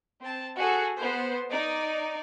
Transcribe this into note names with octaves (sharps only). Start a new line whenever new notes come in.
C4 A5
F#4 G#4 A4
B3 C5
D#4 D5